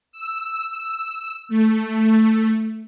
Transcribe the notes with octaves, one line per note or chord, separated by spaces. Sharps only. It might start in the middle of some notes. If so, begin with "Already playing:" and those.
E6
A3